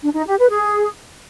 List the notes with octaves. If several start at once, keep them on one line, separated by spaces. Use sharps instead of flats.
D4
D#4
G4
B4
G#4